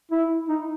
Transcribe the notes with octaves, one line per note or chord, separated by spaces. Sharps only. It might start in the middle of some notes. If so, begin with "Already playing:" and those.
E4
D#4